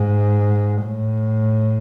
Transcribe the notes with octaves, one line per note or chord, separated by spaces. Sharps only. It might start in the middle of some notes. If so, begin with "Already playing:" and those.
Already playing: G#2
A2